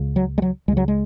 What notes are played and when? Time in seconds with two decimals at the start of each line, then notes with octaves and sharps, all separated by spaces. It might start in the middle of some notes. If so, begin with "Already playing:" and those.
Already playing: C#2 C#3
0.16 F#3
0.38 G#3
0.42 F#3
0.68 C#2 G#3
0.72 C#3 F#3
0.88 G#3